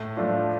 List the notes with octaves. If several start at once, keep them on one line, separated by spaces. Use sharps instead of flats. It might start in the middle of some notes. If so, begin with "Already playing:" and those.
Already playing: A2
F3 A3 D4 F4